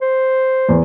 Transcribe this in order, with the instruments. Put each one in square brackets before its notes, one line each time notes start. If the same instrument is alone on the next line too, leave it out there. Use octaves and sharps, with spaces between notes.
[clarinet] C5
[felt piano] E2